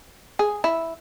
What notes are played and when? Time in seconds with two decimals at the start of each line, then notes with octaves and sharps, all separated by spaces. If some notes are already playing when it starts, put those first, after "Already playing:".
0.39 G#4
0.64 E4